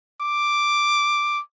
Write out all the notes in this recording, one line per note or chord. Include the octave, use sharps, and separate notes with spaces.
D6